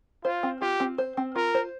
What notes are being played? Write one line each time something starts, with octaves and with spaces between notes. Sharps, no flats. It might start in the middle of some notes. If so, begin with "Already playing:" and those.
F4 C5
C4
F4 G4
C4
C5
C4
F4 A#4
C5